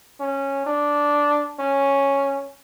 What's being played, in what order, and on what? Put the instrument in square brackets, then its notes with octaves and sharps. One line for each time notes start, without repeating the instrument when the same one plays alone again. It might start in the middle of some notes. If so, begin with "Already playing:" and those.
[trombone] C#4
D4
C#4